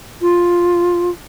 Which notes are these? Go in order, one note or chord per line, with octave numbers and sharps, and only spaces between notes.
F4